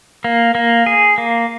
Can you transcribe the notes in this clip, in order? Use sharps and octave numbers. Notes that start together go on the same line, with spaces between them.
A#3
A#3
G#4
A#3